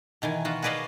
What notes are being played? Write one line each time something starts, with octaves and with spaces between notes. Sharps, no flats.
B2 D#3 E3 G#5
B3 F4 F#4
F#4 G#4 B4 D5 D#5 F5